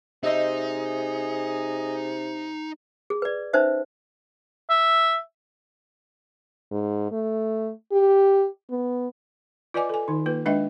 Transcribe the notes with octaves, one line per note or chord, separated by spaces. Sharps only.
C3 D#4 G#4 C5 D#5 E5
G#4
B4 D5
C#4 D#4 B4 C5 E5
E5
G#2
A3
G4
B3
F4 B4 D5 D#5 G#5 D6
A4 G#5
D#3 D#4
A#3 F4 B4
G#3 D4 B4 D#5 E5 G5